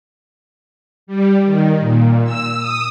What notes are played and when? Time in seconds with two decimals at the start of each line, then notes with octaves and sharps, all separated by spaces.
1.07 G3
1.44 D#3
1.80 A#2
2.24 E6
2.58 D#6